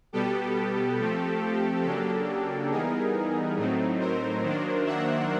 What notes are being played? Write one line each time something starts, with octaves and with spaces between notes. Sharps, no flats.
B2 G3 B3 G4 A4
F3 A3 C4
C#3 F#3 A#3 D4 G4 A4
E3 G3 B3 D#4 G#4 A#4
A2 F#3 A3 C4 D#4
A#4 C5
D#3 F#3 A#3 D4
E5 F#5